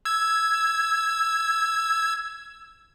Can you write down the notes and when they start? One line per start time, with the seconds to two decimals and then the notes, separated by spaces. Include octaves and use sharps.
0.05 E6 G#6